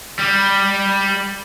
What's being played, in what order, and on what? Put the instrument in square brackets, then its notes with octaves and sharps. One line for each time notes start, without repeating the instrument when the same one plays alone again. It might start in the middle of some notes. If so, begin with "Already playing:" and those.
[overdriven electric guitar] G3